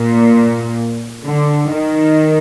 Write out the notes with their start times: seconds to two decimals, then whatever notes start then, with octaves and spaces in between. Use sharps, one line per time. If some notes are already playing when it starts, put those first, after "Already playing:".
Already playing: A#2
1.25 D3
1.73 D#3